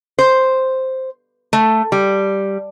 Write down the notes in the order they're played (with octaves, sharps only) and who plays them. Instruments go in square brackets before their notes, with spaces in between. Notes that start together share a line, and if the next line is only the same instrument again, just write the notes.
[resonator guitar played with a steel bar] C5
A3
G3